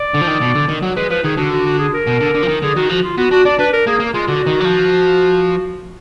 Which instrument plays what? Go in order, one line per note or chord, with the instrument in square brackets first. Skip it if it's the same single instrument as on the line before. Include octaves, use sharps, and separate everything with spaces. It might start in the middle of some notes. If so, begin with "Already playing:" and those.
Already playing: [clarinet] D5
[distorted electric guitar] D3
F3
D#3
B2
D3
D#3
F#3
[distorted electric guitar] G#3 [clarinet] B4
[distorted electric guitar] F3 [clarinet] B4
[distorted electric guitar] D#3 [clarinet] G#4
[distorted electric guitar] D3 [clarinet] F#4
[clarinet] F#4
F#4
G#4
A#4
[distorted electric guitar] B2
D3
D3
F3
D#3
[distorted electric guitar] D3 [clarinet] G#4
[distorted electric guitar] D#3 [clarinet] F#4
[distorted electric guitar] F3 [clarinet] F#4
[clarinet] F4
[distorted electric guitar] B3 [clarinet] F#4
[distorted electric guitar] D4 [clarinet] F#4
[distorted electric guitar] D4 [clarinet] D5
[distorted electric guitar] D4 [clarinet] B4
[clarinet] A#4
[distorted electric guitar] A#3 [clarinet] G#4
[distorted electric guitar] A#3
[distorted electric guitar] G#3 [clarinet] F4
[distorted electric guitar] D3 [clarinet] F#4
[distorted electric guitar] D#3
F#3
F3